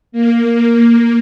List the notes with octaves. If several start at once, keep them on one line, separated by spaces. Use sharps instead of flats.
A#3